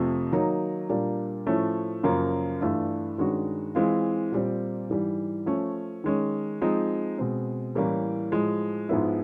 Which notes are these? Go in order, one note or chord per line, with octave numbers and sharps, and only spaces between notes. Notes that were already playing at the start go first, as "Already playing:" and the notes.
Already playing: F2 C3 F3 A3
D#3 F#3 A#3 D#4
A#2 G3 A#3 D4
A2 F3 A3 C#4
F#2 C#3 F3 A#3 C#4
G2 E3 A3 D4 F4
G2 D#3 G#3 C#4 F#4
E3 G#3 C4 F4
A#2 G3 C4
G#2 E3 G3
F3 A3 C#4
D#3 G#3 C#4
F3 G#3 C4 D#4
B2 G#3 C4
A2 E3 G3 A#3 C#4
A2 F3 G#3
G#2 F3 G#3 B3 E4